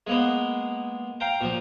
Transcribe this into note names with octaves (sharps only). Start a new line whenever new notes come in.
G#3 A#3 B3
F5 G5 A#5
A#2 F3